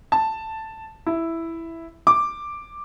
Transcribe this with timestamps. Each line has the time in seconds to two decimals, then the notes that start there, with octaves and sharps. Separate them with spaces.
0.12 A5
1.07 E4
2.07 D6